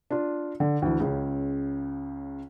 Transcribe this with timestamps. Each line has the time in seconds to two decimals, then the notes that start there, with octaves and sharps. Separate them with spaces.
0.11 D4 F4
0.60 D3
0.82 D2 E3
1.00 C#2 C#3